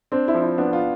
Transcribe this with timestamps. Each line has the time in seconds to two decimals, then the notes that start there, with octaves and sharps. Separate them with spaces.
0.12 C4 D4
0.28 E4
0.34 F3
0.42 E4
0.58 B3 D4
0.73 F4